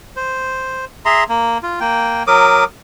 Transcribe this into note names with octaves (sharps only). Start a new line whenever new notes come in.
C5
G#4 E5 A#5 C6
A#3
F4
A#3 G5
F#3 A#4 D6 D#6